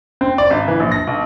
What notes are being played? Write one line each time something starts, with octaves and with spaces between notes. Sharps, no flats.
C4
D5
G#1
E3
A#1
A#6
B1